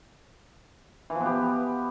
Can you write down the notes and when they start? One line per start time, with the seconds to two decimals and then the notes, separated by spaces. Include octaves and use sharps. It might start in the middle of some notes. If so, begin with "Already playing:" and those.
1.10 E3
1.15 F3
1.20 B3
1.26 G4